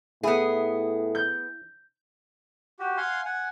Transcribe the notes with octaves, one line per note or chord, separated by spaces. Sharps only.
A2 B3 E4 G#4
G6
F#4 G4
F5 F#5 G#5 C6
F#5 G#5